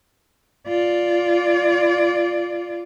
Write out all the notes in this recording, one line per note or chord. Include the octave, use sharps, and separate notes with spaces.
F4 D5